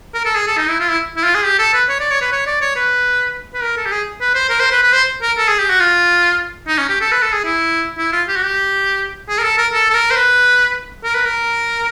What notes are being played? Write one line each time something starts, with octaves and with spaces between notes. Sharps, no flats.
A#4
A4
G#4
A4
D#4
E4
F4
E4
E4
F4
G#4
G4
A4
B4
C#5
D5
C#5
B4
C#5
D5
C#5
B4
B4
A#4
A4
G4
G#4
B4
C5
A#4
C5
B4
B4
C5
A#4
A4
G#4
G4
F#4
F4
D#4
C#4
G4
A4
B4
A4
G#4
E4
E4
F4
G4
F#4
G4
G#4
A#4
A4
A#4
A4
A4
A#4
C5
B4
A#4
B4
A#4